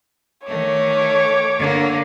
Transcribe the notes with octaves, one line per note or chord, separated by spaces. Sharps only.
D#3 A3 C#5 D6
D3 A#3